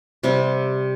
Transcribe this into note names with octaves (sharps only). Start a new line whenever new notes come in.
C3 G3 C4